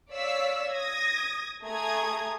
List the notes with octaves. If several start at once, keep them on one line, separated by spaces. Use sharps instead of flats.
C#5 D5 F5 E6 B6
D#6 G#6 A#6
A3 G#4 A#5 D#6 G#6